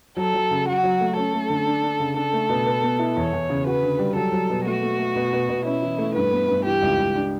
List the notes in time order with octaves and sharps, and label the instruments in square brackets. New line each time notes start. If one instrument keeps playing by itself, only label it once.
[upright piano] F#3 [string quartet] A4
[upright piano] F#3
C#3
[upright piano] F#3 [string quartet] F#4
[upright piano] F#3
A3
[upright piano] C#4 [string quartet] A4
[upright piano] A3
D3
D4
D4
C#3
[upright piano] D4 [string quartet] A4
[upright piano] A3
B2
B4
B3
E4
[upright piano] E2 [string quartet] C#5
[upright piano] E2
C#3
[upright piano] F#4 [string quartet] B4
[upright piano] D3
G3
[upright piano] F#3 [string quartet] A4
[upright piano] F#3
B2
[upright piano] A3 [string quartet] F#4
[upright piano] A3
A3
B2
B2
B2
[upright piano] C#4 [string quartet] E4
[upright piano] E3
A3
[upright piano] G2 [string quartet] B4
[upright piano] B3
G2
[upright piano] E3 [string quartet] G4
[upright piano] C#2
C#2
D4